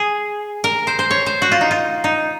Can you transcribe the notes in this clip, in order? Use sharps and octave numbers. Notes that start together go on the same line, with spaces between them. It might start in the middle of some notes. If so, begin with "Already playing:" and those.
Already playing: G#4
A#4
C5
C5
C#5
C5
F#4
F4
D#4
F4
D#4